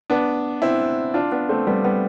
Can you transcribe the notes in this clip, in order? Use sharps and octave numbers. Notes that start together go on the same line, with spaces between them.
B3 D4
C4 E4
D4 F4
B3 D4
A3 C4
G3 B3
G3 B3